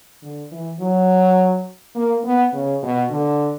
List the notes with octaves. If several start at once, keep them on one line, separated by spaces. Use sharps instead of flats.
D3
E3
F#3
A#3
B3
C#3
B2
D3